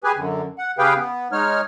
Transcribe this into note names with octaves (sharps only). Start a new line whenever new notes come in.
G4 G#4 B4 G#5
F#2 D3
F#5
C#3 G4 G#4 B4 F5 G5
B3
G#3 D#4 C#5 F6